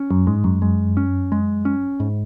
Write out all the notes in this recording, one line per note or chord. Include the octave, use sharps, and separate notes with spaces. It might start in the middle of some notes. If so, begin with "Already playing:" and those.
Already playing: C#4
F#2
G#2 G#3
F#2
G#3
C#4
G#3
C#4
G#2